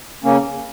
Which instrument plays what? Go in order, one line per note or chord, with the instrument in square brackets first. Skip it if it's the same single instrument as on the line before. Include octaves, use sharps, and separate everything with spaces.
[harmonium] C#3 A#3 C#4